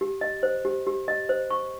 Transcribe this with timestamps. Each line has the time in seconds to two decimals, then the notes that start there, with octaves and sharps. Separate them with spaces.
0.01 G4
0.21 D#5
0.43 C5
0.65 G4
0.87 G4
1.08 D#5
1.29 C5
1.50 C#6